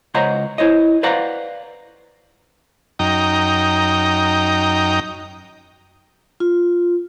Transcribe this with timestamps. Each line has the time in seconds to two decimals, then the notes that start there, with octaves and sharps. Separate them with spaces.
0.14 C#2 C5 C#5 D#5 F#5 A#5
0.58 E4 C5 C#5 D#5
1.03 B4 C5 D5 F5 F#5 A#5
2.99 F#2 D#4 G5 A#5
6.40 F4